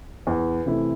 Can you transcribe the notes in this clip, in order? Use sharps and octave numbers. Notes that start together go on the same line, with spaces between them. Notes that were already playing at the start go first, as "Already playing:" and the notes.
E2
C3 E3 A3 E4